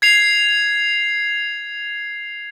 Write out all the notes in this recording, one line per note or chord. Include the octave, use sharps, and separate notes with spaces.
G#6 C7 F7